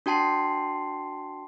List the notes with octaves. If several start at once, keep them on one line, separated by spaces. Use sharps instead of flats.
D4 F#4 G5 A5 C6 C7